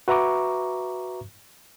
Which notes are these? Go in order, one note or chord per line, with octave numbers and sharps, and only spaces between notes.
F#4 B4 E5 A#5 C#6 D6